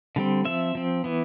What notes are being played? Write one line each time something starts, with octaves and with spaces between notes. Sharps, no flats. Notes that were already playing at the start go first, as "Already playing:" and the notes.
D3 G3 C4
F3 C4 E5
F3 C4
E3 B3